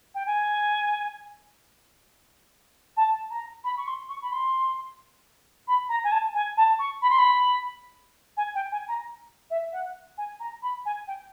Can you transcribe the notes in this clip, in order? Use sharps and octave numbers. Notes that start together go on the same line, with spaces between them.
G5
G#5
A5
A#5
B5
C#6
C6
C#6
B5
C6
B5
A#5
G#5
A5
G#5
A5
C#6
B5
C6
B5
G#5
G5
G#5
A#5
E5
F#5
G#5
A#5
B5
G#5
G5